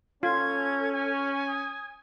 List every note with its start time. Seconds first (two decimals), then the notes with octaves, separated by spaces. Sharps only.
0.23 C#4 F4 A4 G#6
0.93 G#5
1.48 D#6